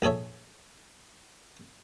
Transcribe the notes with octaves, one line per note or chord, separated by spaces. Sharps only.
A#1 G#4 A4 C#5 E5